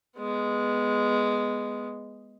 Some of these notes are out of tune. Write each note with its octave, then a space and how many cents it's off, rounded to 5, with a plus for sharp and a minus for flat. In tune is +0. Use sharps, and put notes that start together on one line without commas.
G#3 +0 B3 +0